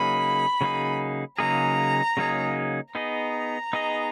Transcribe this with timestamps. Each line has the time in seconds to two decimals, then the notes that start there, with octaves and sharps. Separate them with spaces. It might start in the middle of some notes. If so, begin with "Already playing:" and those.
Already playing: C#3 F#3 A#3 D#4 G#4 B5
0.61 C#3 F#3 A#3 D#4 G#4
1.38 C#3 F#3 A#3 D#4 G#4 A#5
2.17 C#3 F#3 A#3 D#4 G#4
2.95 B3 D#4 G#4 D#5 A#5
3.73 B3 D#4 G#4 D#5